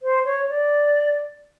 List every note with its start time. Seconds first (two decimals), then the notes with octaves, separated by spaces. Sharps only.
0.02 C5
0.25 C#5
0.49 D5